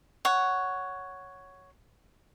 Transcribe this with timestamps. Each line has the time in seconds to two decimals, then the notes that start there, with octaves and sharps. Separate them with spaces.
0.25 C#5 F#5